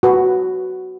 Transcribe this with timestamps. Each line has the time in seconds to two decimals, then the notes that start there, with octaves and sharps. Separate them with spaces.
0.03 F#4 B4